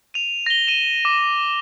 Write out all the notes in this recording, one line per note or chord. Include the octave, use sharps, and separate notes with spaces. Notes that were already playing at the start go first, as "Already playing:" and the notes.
D#7 F7
A#6 G7
D#7 E7
D6